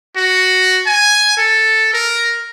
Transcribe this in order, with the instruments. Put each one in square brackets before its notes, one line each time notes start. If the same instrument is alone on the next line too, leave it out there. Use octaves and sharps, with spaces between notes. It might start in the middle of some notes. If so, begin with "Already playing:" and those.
[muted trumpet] F#4
G#5
A4
A#4